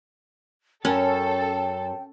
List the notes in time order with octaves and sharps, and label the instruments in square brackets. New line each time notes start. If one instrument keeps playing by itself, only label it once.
[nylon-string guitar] F#2 [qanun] C#4 [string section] A4 [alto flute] G5